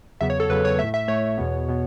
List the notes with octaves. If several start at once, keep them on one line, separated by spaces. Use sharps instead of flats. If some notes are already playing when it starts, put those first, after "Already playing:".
E2 C#3 F#3 B3 E5
C#5
A4
E2 C#3 F#3 B3 B4
C#5
A2 A3 E5
E5
A2 A3 C#5
E2 B2 B3
B2 B3